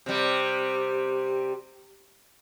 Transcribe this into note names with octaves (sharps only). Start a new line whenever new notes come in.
C3 G3